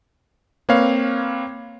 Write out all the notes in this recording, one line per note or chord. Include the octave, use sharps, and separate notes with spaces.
A#3 C4 B4 C#5 F5